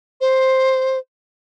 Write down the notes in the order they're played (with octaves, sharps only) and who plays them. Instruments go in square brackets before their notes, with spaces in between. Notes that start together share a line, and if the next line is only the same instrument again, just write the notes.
[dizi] C5